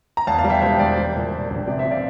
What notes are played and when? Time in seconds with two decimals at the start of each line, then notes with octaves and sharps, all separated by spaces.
0.17 A#5
0.27 E2 F5 A5
0.39 F5 A5
0.44 G3
0.50 E5 G5
0.62 E1 C5 E5
0.79 E2 D5
0.97 G3 C5
1.15 A#2
1.33 A#2
1.50 A#1 D5
1.67 C3 D5
1.79 C5 E5
1.85 C3
1.91 D5 F5